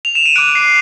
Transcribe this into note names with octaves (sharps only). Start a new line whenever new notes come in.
F7
E7
D#7
D6 F#6 D7
C7